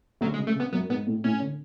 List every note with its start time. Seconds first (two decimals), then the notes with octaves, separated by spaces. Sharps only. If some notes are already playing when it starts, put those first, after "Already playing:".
0.21 D2 D3 F#3
0.34 G#3
0.39 C#3
0.47 A3
0.55 C#3
0.60 B3
0.72 F#2 F#3 B3
0.89 G#2 G#3 B3
1.07 A2 A3
1.24 A2 A3 C#4
1.42 D3